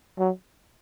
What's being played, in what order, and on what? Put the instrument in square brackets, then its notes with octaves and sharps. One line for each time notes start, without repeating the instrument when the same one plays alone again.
[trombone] F#3